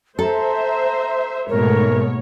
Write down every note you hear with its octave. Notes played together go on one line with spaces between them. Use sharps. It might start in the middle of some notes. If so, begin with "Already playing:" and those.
A4 C5 E5 A#5
G#2 B2 A3 A#3 A#4 C#5